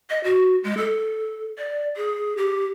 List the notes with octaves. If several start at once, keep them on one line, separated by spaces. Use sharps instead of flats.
D#5
F#4
G#3
A4
D5
G#4
G4